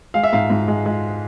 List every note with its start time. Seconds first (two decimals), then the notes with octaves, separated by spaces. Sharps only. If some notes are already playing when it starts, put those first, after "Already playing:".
0.14 G#3 F5
0.23 E5
0.33 G#2 F5
0.50 G#2
0.68 G#3
0.86 G#3